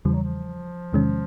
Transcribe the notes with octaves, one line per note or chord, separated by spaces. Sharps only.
E2 C#3 E3 F3 G3
F#3
F3
E2 C3 D#3 G#3 C#4